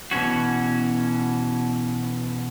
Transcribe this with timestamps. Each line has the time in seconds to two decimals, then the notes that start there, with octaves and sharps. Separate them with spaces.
0.11 B2 E3 C#4 F#4